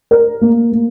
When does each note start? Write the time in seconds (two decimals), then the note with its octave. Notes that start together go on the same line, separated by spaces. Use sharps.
0.11 A#4
0.41 A#3
0.72 A#3